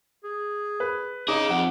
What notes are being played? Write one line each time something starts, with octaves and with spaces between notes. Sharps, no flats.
G#4
B4
D#4 G#4 C#5 D6
F2 F#5